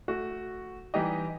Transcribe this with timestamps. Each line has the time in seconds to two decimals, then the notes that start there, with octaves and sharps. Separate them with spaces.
0.08 A3 F#4
0.94 E3 G3 D#4 G4 D#5